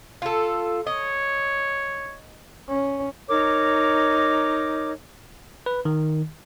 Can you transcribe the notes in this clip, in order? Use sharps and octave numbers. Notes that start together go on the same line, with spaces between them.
F4 A4
C#5 D#5
C#4
D#4 A#4 C#5 D6
B4
D#3